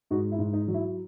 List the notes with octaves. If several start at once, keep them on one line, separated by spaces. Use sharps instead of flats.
G#2 D#4 F#4
E4
G#2
D#4
F#3
E4